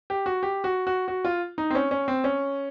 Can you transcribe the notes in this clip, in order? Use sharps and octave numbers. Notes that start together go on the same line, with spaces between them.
G4
F#4
G4
F#4
F#4
F#4
F4
D#4
C4
C#4
C#4
C4
C#4